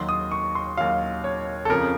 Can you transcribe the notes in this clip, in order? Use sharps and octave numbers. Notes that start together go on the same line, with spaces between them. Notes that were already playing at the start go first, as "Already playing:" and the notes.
Already playing: D#2 D#3 F#3 C6
D#6
C#6
C6
D#2 D#3 F#3 F5
C#5
A4
F2 C#3 F3 A#4